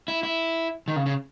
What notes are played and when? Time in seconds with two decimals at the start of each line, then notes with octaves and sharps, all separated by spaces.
0.08 E4
0.23 E4
0.88 D#3
0.96 C#3
1.06 C#3